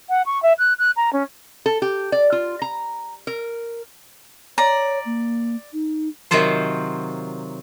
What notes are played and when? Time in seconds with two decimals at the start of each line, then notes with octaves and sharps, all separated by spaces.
0.09 F#5
0.25 C#6
0.42 E5
0.58 F#6
0.78 F#6
0.96 A#5
1.12 C#4
1.66 A4
1.82 G4
2.12 D5
2.32 F4
2.62 A#5
3.27 A#4
4.58 C#5 D5 A#5
5.06 A#3
5.73 D#4
6.31 C3 D#3 F#3 F4 C5